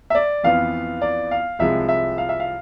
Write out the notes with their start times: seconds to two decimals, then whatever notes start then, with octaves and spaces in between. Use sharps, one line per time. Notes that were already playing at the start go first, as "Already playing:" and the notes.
0.10 E5
0.15 D5
0.44 F2 E3 B3 F4 F5
1.02 D5
1.31 F5
1.59 C2 C3 F3 G#3 E5
1.89 E5
2.18 F5
2.29 E5
2.40 F5